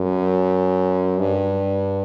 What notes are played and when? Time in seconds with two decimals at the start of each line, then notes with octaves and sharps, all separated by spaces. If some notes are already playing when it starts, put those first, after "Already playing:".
Already playing: F#2
1.18 G2